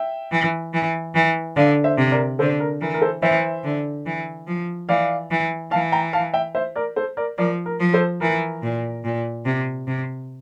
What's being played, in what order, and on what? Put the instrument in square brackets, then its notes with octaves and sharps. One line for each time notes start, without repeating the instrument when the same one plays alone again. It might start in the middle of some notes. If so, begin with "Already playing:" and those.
Already playing: [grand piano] E5 G5
[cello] E3
E3
E3
[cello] D3 [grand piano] D5 F5
[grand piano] C5 E5
[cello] C3
[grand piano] A#4 D5
[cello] D3 [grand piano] A4 C5
[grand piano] A#4
[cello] E3 [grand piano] A#4
[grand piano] A#4
A4 C5
[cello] E3 [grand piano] C5 E5
[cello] D3
E3
F3
[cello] E3 [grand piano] D5 F5
[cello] E3
[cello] E3 [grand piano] F5 A5
[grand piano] G5 A#5
F5 A5
E5 G5
C5 E5
A#4 D5
A4 C5
A#4 D5
[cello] F3 [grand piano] A#4 D5
[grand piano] A#4
[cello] F3
[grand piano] A4 C5
[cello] E3 [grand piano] A#4
[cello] A#2
A#2
C3
C3